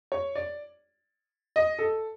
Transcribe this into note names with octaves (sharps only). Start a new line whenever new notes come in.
C#5
D5
D#5
A4